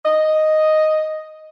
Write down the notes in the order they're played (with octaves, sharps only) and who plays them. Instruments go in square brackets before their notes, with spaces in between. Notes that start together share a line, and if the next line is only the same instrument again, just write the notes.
[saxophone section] D#5